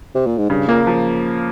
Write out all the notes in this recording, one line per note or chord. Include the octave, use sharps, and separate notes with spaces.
C3
A#2
G#2
G2 C#3
A#2 A#3
F3